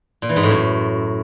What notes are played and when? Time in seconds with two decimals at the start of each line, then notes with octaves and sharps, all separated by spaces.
0.22 A#2
0.29 E3
0.36 G#2
0.43 A2
0.50 F#2